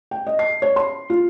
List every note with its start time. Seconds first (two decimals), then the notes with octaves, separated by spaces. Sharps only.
0.11 G5
0.27 D#5
0.39 C7
0.62 C#5
0.76 C6
1.10 F4